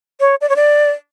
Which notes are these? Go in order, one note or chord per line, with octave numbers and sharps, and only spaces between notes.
C#5
D5
C#5
D5